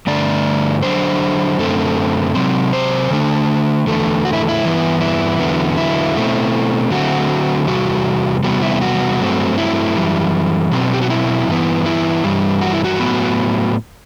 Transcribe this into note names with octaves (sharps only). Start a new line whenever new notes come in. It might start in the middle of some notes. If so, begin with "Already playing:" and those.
G2 D3 A3 D4 D5
D3 F#3 B3 D4 C5
F#2 D3 A3 C4
C3 F#3 C4
C5
D3 A3 D4
E2 D3 A3
F#4
E4
E4
G2 E3 B3
E4
E2 D3 F#3 B3
E4
B2 A3 C4
D3 F#3 A3 C4 F#4
E2 C3 G3 F#4
E2 C3 G3 B3 F#4
E4
F#4
G2 F#3 A3 C4
E4
F#2 E3 G3
B2 F#3 C4
G4
F#4
E4
G2 E3 B3
E4
G2 E3 G3
F#4
E4
F#4
A2 F#3 B3